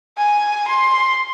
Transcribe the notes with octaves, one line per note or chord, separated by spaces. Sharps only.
G#5
C6